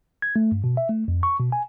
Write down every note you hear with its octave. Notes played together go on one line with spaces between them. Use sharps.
G#6
A3
G2
B2
E5
A3
F2
C#6
B2
G#5